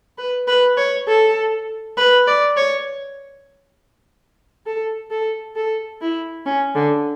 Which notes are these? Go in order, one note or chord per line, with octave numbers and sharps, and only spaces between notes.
B4
B4
C#5
A4
B4
D5
C#5
A4
A4
A4
E4
C#4
D3